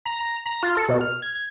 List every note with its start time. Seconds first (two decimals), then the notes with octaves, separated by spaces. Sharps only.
0.05 A#5
0.20 A#5
0.46 A#5
0.63 F4
0.77 A4
0.88 B2
1.01 F6
1.22 G#6
1.35 G#6